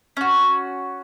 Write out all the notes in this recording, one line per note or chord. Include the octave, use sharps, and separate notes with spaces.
C#4 F#4